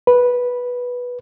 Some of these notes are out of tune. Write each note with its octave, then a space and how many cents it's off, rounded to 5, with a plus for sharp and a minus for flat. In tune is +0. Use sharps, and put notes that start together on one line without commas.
B4 -10